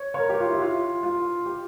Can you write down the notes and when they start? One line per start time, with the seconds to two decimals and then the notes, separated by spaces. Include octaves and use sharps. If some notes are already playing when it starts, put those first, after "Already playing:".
Already playing: C#5
0.14 C#5
0.19 A#4
0.29 G4
0.40 F4
0.51 E4
0.62 F4
1.03 F4
1.46 G4